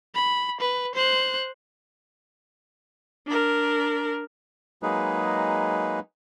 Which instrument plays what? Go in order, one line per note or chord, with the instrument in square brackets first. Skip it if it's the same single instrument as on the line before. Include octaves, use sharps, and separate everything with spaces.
[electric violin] B5
B4
C5 F#6
[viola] D4 A#4
[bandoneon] F#3 G#3 A#3 D#4 G#4 B4